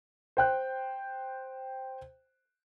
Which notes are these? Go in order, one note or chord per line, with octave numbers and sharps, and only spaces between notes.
C5 G5 F#6